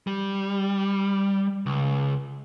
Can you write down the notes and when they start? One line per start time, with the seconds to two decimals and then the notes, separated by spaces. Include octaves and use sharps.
0.07 G3
1.66 C#2